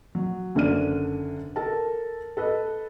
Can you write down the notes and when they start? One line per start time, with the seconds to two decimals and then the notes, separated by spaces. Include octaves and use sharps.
0.15 F#3
0.55 F#1 D3 C#4 D4 F6 D#7
1.56 A4 A#4 A5
2.37 A4 B4 D#5